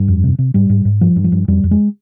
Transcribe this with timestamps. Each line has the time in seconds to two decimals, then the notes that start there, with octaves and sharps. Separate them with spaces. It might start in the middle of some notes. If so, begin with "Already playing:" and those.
Already playing: G2
0.08 F2
0.24 C3
0.39 C3
0.54 G#2 G3
0.70 G#2
0.85 G#2
1.01 G2 F3
1.16 G2
1.24 F3
1.32 G2
1.48 F2 G3
1.64 F2
1.71 G#3